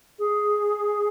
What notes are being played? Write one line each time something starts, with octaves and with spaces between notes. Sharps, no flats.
G#4